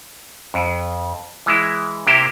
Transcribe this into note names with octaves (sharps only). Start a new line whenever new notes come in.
F2
E3 G#3 E4
C3 A#3 E4 G4 C5